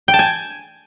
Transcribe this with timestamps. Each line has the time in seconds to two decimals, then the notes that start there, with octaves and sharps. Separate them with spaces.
0.08 G5
0.14 A5
0.19 G#5